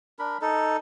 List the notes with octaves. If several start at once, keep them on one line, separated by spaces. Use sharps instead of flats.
D4 A#4 B5
D#4 A4